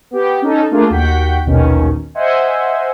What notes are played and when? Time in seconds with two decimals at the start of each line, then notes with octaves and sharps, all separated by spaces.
0.11 B3 G4
0.42 C#4 D#4 A4
0.71 A3 A#3 D4 F4 G#4
0.90 D#2 F#4 F#5 G5 G6 B6
1.45 A#1 D#2 B2 D#3 C#4
2.15 C5 D#5 E5 F#5 G#5